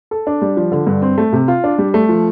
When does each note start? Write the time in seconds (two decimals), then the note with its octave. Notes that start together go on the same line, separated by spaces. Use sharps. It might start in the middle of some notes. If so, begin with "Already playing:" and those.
0.11 A4
0.27 D4
0.42 G3
0.57 F3
0.72 D3
0.87 G2
1.02 C4
1.18 A3
1.33 C3
1.48 F4
1.64 D4
1.78 G3
1.94 A3
2.09 F3